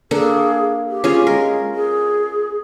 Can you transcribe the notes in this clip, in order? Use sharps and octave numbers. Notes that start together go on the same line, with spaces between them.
A#3 D4 G#4 A4
G4
C#4 F4 G#4
G#3 A#4
G#4